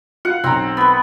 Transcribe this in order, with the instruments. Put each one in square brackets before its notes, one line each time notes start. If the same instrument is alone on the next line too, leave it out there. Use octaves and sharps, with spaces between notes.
[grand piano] F4 F5 [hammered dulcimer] F#5
[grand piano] B1 A#5 [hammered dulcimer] C4
[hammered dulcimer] B3 B4